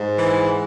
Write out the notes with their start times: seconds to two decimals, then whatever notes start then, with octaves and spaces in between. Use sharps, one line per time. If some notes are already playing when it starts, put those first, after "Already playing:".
Already playing: G#2
0.18 E3